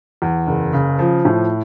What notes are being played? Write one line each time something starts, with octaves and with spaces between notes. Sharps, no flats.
E2
F#1
C#3
F3
A2